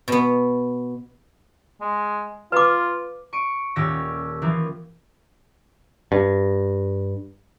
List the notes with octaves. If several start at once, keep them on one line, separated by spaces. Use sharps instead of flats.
B2 B3
G#3
F4 B4 D6
C#6 D7 D#7
D#1 C#4 G4 E6 A#6
E3 F3 A#3
G2